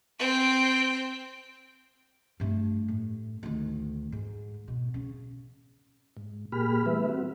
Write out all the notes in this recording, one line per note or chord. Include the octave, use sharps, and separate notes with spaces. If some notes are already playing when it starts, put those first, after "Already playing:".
C4 G5
G2 A3
A2
D2 D#3
G#2
B2
C#3
G#2
A#2 A#3 G4 G#4 B5 F6
E3 G3 A3 B3 B4 E5
C4 F#4